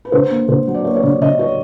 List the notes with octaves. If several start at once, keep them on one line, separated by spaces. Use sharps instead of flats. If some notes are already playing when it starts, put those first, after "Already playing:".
B4
D3 C5
A#3
D3 C5
F#3
D5
A#3 C#5
C#5
D3 D5
D3 D#5
F#3 C#5